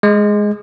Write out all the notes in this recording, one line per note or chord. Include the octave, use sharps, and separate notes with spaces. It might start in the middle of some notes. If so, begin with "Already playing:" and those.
G#3